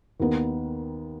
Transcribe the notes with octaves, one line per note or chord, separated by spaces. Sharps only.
D#2 D#3 B3